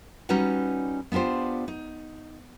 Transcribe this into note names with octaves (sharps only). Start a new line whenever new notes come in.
G3 C#4 D#4 F#4 B4 F#5
B3 D4 F4 G4 C5
D#4